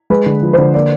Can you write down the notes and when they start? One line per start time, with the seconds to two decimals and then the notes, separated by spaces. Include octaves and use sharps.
0.10 G#3 B4
0.26 D3
0.42 F3
0.53 D3 C5
0.74 A#3 D5